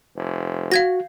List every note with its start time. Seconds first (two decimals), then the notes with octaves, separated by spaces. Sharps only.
0.16 F1
0.72 F#4 F5 G#6 A#6